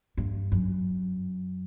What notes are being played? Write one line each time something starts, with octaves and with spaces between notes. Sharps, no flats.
G2
F#2